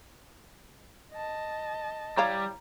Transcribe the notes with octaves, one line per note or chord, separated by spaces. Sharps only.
D#5 A5
G3 E4 C#5 F5 A#5